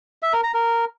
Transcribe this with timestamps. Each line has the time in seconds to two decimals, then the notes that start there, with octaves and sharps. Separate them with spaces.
0.22 E5
0.33 A#4
0.43 A#5
0.54 A#4